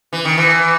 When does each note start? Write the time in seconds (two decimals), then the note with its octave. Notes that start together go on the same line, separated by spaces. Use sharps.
0.13 E3
0.25 D#3
0.38 E3